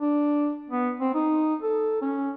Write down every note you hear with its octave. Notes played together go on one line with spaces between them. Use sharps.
D4
B3
C4
D#4
A4
C#4